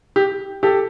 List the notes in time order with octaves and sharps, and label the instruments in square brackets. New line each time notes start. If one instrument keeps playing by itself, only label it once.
[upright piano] G4
G4 A4